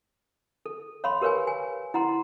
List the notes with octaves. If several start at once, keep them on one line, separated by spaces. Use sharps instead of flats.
A4
C#5 F5 B5 C6
G4 A#4 B4 C#5 F5 G#5
G#5
E4 F#5 A#5 C6